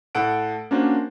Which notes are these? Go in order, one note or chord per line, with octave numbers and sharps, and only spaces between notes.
A2 A4 F#5 D7
A#3 C#4 D4 F#4 C5